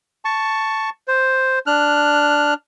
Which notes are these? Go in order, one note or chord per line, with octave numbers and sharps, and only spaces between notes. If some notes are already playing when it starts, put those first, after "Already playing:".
A5 C#6
C5
D4 F6 F#6